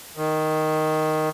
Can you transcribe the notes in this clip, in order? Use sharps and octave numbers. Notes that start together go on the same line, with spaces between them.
D#3